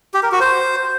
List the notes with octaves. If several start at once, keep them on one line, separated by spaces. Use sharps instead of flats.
G4
A#4
F#4
C5